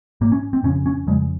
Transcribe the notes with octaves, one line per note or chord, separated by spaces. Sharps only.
G#2 A#3
C#4
C4
F2 C#3 C#4
C#4
F2 C#3 G#3